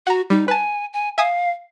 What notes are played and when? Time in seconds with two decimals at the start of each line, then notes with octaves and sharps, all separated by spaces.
0.07 F#4 F#5 A#5
0.30 G3 D#4
0.48 B4 G#5 A5
0.93 G#5
1.18 E5 F5 G#5 D#6